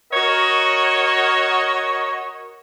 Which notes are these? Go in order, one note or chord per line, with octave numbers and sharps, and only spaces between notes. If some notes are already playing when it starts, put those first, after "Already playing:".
F#4 A#4 C#5 D#5 F#5